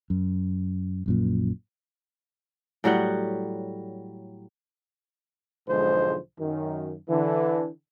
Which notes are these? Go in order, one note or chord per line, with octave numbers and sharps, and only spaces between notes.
F#2
A#1 F#2 A#2
A2 F#3 G3 F#5
B1 G#2 D3 F3 G#3 C5
F#2 D#3
D3 E3